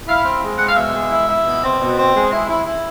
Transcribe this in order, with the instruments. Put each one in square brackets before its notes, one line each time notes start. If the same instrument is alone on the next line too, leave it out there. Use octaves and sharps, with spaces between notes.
[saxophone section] E4 F5
C4
G#3
G#3 F#5
F5
B2 E5
G#3
E4
E4
B2
C4
B2
C4
G#3
E4
E4
E4